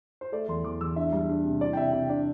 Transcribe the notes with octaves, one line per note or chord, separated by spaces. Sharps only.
C5
A3 D5
E2 C6
E2 D6
E2 E6
D4 E5
G3
D4
C3
E3 D5
G5
C3 E5
C3 G5
D4 D5